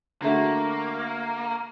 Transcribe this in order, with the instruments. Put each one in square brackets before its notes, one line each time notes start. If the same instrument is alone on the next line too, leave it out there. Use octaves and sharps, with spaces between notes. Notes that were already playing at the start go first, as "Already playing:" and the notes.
[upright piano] D3 A3 F#4 [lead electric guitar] A#3